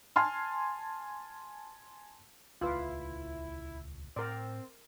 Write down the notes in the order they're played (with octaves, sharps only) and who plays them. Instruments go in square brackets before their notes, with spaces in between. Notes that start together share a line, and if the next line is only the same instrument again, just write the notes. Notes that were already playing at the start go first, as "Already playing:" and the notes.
[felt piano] G#5 A5 C6 F6
[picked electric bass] D#1 C#2 A3 [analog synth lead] E4 [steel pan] F4 B4
[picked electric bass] A2 [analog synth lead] C4 [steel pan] A#4 D5